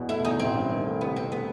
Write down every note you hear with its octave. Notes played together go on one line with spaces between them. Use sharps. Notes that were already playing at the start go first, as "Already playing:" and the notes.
Already playing: E2 B2
A3 E4
E2 D#4
A1 C4
G2
D#3
A3
C2 B3
B2 C4
A3 B3